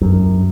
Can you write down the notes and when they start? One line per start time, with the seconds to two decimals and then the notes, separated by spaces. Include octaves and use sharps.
0.01 F#2